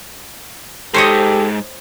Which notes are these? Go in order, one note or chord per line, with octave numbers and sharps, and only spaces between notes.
G#2 G4 A4 C5 C#5 D#5